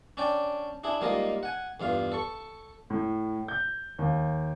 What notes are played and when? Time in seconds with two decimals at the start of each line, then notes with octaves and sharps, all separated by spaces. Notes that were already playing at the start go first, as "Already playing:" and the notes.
0.17 C#4 D4 D5 G5
0.84 D4 E4 G#4
1.01 G#2 G3 A#3 F4 D#5
1.43 F#5 G#5
1.80 E2 G2 F4 F5
2.12 A4 C#6
2.90 A2
3.48 G6
3.99 D#2